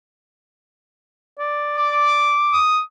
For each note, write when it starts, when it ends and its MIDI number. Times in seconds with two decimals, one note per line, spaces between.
1.39 2.35 74
1.78 2.61 86
2.53 2.80 87